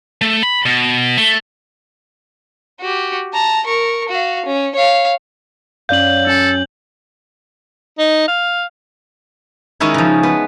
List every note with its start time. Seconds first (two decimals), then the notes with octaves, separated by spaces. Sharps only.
0.21 A3
0.43 B5
0.66 B2
1.17 A3
2.80 F#4 G4
3.33 A5 A#5
3.66 A#4 C#6
4.08 F#4 F5
4.46 C#4
4.76 C#5 F5
5.89 F#2 C#4 D5 F5 G6 F#7
6.27 C#4 A4 G#5
7.99 D#4
8.28 F5
9.80 D#3 G#3 C#4 D#4 E4 C#5
9.94 C#3 F3
10.23 B3